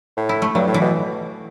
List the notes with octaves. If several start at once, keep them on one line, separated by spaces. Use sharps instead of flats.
A2
E4
A3
G2 F#3
A2
E3
B2